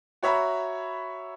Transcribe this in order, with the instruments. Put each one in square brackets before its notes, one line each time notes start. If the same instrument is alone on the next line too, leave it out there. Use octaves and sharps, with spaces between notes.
[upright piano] F#4 C#5 E5 A#5 B5